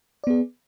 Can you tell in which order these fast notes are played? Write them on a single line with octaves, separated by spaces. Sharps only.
D5 B3 G#4